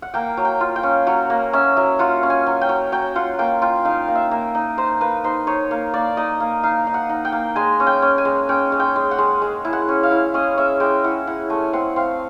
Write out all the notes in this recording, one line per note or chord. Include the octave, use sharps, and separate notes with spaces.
F#5
A#3 G5
F#3
G5
F4
G5
C#4
F#3 F#5
A#3
C#4 E5
F#3 E5
F4 F#5
C#4
G#5
F#3
G5
F#3
F#3 G5
F4 F#5
A#3 G5
F4 G5
D#4 F5
A#3
E5
A#3
D#4
D#4 C5
A#3 B4
D#4 C5
D#4 C#5
A#3
A#3 D5
D#4 D#5
A#3
D#4 F5
D#4
F#5
D#4
G5
A#3
G#3 G#5
C#4
G5
C#4
G#5
G#3
C#4 G5
G#3
G5
G#3
F#5
G#3
G#3
E4
F#5
C#4
F5
E4
C#4 D#5
C#4 E5
G#3 G5
E4 F#5
E4 F#5
A3 G#5
C4 F#5
C4 F5